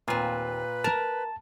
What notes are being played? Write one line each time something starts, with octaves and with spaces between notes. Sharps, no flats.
D#2 A#2 C4 F4 B4 G#5
A#4 A5